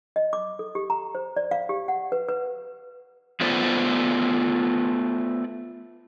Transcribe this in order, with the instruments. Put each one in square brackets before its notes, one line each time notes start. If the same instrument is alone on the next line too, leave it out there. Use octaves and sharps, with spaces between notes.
[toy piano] D#5
D6
A4
G4
A#5
C5
D5
F5
G4
F#5
B4
B4
[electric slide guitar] A3 B3 F4 B4 C5 D5